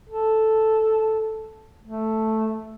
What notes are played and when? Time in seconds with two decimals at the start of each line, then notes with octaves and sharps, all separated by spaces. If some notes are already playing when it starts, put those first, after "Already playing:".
0.09 A4
1.83 A3